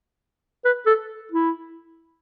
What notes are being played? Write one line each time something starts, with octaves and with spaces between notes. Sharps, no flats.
B4
A4
E4